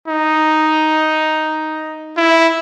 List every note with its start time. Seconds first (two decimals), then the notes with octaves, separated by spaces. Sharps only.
0.08 D#4
2.17 E4